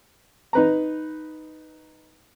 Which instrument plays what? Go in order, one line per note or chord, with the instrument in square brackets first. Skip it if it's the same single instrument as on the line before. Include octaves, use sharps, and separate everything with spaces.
[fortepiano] D#4 B4 A#5